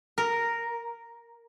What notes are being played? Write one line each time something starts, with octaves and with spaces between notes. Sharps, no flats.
A#4